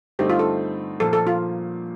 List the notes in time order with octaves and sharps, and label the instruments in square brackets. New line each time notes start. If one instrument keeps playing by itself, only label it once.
[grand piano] G2 D3 A3 C4 D#4 [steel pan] G4
[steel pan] F4
A4
[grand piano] A#2 F3 A#3 [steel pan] A4
[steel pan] A4
F4